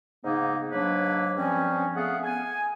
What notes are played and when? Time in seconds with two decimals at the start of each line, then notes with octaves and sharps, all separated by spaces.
0.24 G#2 C#3 A#3 B3 D#4
0.72 G#2 F#3 A#3 D4 B4 C#5
1.37 G2 F3 C4 C#4
1.95 A3 B3 G#4 F5 F#5
2.24 G#5